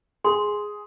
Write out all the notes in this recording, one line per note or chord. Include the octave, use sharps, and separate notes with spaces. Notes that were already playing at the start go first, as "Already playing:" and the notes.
G#4 C6